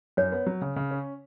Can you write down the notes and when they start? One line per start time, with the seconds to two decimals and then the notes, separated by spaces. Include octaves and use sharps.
0.17 F#2 C#5
0.32 B3
0.47 F#3
0.62 C#3
0.76 C#3
0.91 C#4